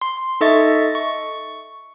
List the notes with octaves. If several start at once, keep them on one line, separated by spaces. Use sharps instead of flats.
C6
D#4 A4 D#5 E5 C#6 A6
C#6